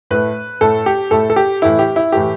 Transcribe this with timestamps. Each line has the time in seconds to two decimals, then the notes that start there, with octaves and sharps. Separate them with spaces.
0.11 A2 A3 B4
0.61 A2 A3 A4
0.86 G4
1.11 A2 A3 A4
1.30 A4
1.36 G4
1.62 A2 E3 A3 E4
1.79 G4
1.96 E4
2.12 A2 E3 A3 G4